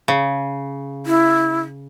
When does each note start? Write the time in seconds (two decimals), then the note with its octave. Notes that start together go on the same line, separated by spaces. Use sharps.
0.08 C#3
1.06 E4